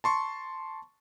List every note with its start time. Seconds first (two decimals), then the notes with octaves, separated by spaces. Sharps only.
0.04 A5 C6 C#6